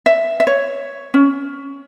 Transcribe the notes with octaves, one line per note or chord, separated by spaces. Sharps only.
E5
E5
C#5
C#4